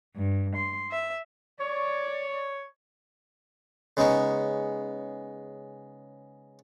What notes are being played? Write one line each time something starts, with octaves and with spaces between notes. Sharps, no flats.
G2
C6
E5
C#5 D5
C#3 G#3 B3 D#4 C#6